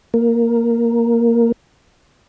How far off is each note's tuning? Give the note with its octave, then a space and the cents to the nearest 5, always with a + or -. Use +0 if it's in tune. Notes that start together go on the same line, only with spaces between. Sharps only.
A#3 +0